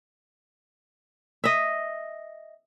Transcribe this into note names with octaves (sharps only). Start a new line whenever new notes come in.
D#5 E5